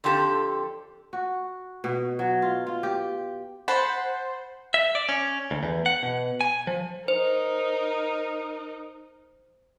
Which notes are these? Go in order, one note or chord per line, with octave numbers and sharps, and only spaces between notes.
F2 D3 C4 G4 A4
F#4
B2
F#3
F4
F4
G4
C5 F#5 A5 B5
E5
D5
C#4
D2
E2
F#5
B2
G#5
F3
D#4 A#4 C5